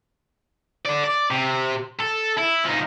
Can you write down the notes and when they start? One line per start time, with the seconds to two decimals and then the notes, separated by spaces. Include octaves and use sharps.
0.86 A4 D5
1.04 D5
1.31 C3
1.99 A4
2.37 E4
2.65 F3 D#4